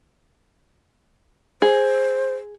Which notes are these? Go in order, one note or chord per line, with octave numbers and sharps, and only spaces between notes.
G#4 C5